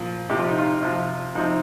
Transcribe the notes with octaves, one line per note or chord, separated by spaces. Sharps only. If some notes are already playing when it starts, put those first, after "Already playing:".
Already playing: A#2 F3
C3 F3 G4
F4
D#4
F4
C3 F3
C3 F3 D#4